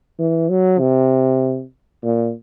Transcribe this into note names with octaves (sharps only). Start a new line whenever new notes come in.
E3
F#3
C3
A#2